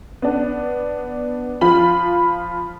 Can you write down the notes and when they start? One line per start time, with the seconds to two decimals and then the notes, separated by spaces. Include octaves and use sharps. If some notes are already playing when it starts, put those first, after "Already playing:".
0.22 B3 D4
1.61 F3 F4 B5 F#7